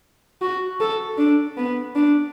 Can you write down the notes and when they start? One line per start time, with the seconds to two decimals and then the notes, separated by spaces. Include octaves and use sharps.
0.42 F#4
0.81 A4
1.18 D4
1.58 B3
1.95 D4